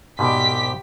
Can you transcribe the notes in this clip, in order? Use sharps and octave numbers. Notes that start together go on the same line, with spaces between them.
C2 G#2 B2 G4 D6 B6